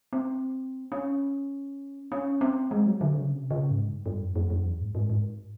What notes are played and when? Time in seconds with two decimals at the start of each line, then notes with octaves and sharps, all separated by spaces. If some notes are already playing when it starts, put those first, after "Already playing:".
0.13 C4
0.92 C#4
2.12 C#4
2.41 C4
2.71 G#3
2.86 F#3
3.01 D3
3.16 C#3
3.31 C3
3.51 C#3
3.70 G#2
3.90 G2
4.06 G2
4.20 F#2
4.36 F#2
4.50 F#2
4.65 E2
4.80 G#2
4.95 G#2
5.10 G#2